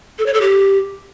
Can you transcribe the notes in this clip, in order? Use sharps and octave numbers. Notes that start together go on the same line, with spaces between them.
A4
C#5
A4
G4